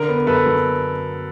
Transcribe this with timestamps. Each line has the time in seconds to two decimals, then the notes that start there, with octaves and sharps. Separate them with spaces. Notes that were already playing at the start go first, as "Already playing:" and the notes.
Already playing: D3 A#4
0.09 B3
0.27 F#2 A4 B4
0.46 F#3